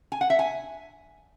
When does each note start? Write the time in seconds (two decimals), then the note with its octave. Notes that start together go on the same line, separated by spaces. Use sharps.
0.12 G#5
0.21 F#5
0.30 E5
0.39 G#5